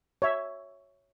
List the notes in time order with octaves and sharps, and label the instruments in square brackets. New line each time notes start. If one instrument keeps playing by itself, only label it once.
[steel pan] C#5 E5